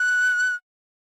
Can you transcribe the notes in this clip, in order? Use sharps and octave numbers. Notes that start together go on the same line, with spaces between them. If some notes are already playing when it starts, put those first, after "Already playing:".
Already playing: F#6